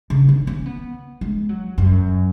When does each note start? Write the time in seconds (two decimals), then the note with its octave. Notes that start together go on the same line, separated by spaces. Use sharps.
0.10 C#3
0.29 D#3
0.47 C#4
0.66 B3
1.21 G#3
1.49 F#3
1.78 F#2